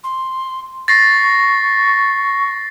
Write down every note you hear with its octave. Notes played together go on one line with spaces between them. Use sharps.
C6
C#6 A6 A#6 C7